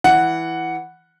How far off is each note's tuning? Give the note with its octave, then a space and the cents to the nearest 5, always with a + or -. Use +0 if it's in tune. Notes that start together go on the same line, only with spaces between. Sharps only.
E3 +0 F#5 +0